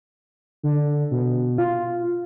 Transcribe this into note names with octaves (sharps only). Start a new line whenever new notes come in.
D3
B2
F4